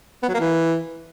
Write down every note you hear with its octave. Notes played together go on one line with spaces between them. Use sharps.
B3
F#3
A#3
E3